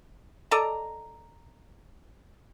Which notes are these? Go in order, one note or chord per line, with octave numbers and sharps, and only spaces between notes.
A4 D5 D#5 A#5